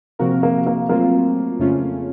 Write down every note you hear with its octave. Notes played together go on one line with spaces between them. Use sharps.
C3 F3 A#3 C4 F#4 A#4
A#3
A#3
F#3 A3 A#3 C4 F4
F2 C#3 A3 C#4 F4